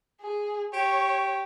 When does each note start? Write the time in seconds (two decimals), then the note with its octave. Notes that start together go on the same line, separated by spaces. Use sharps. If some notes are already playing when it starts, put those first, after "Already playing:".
0.21 G#4
0.73 G4 C#5